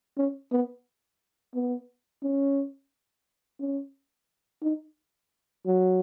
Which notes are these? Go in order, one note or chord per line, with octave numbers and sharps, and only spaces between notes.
C#4
B3
B3
C#4
C#4
D#4
F#3